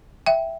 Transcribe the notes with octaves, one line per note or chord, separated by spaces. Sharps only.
E5 G5